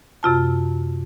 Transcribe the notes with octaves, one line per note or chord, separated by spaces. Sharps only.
F#2 C3 F4 A5